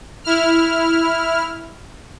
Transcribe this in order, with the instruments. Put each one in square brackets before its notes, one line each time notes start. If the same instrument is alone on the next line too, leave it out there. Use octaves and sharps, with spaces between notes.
[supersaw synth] E4 F6